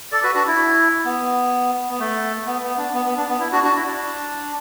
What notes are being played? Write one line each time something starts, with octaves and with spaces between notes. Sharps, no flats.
A4 D5
F#4 B4
D4 F#4
E4
B3
B3
A3
B3
B3
D4
B3
B3
D4
B3
E4
D4 F#4
D4 F#4
E4
D4